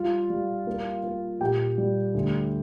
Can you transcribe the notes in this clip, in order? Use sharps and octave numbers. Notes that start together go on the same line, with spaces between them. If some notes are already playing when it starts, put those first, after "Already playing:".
Already playing: G3 F4 F5
G3
A#3
A#3
A#2 G4 G5
G3
D2